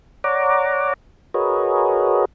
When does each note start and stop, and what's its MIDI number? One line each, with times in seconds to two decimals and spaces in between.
0.24 0.94 73
0.24 0.94 74
0.24 0.94 78
0.24 0.94 82
0.24 0.94 86
1.34 2.25 66
1.34 2.25 68
1.34 2.25 70
1.34 2.25 71
1.34 2.25 73
1.34 2.25 75